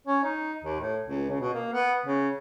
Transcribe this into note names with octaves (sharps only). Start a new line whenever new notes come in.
C#4
D#4
D#2
A2
C#2
C#3
B2
A#3
B3
C#3